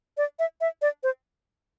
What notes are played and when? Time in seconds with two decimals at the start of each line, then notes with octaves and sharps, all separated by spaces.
0.17 D5
0.39 E5
0.61 E5
0.82 D5
1.03 C5